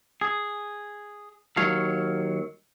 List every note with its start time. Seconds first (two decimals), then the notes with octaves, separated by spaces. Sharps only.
0.21 G#4
1.57 D#2 F#3 C#5 F5